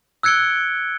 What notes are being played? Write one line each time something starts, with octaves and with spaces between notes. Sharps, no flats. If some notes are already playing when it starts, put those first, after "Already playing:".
E6 F#6 G#6 C#7 D7 G7